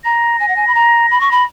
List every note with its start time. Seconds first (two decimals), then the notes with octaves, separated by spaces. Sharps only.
0.04 A#5 A#6
0.40 G#5
0.48 F#5
0.56 G#5
0.67 B5
0.74 A#5
1.11 B5
1.21 C#6
1.31 B5